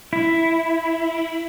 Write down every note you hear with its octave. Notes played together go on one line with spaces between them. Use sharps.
E4